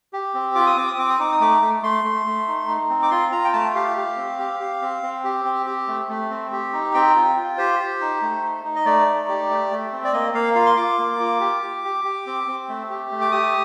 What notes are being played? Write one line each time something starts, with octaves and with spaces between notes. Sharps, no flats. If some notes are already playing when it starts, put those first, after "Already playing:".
G4
C4
F4 D6
D#6
C4 D6
D#6
C4 D6
D#6
D#4 D6
D#6
A3 D6
A3
A3 C6
A3
A3
D#4
D#4
C4
D6
F4 C6
F4 A#5
G5
A3 A5
G4 F5
G4
C4
G4
G4
C4
C4
G4
C4
G4
A3
A3
C4
G4
D#4
C4 G5
F4
F4
G4 C5
G4
D#4
A3
D#4
D#4
D#5
A3 D5
D#4
G4
A3
A3
C4
D5
A#3 D#5
A#3 F5
F4 F5
C6
F4 D6
A#3
F4
G4
G4
G4
G4
C4
C4
A3
G4
A3
D6
G4 D#6